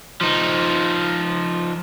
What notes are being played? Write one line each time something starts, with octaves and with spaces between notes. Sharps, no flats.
F3 D#4